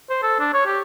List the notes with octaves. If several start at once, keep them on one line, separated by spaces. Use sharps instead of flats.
C5
A4
D4
C#5
G4